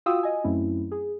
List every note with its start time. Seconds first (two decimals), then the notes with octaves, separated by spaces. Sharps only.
0.06 F4 F#4 F5 G5 D#6 E6
0.23 D#5 G#5
0.44 F#2 F#3 A3 C4 C#4 E4
0.92 G#4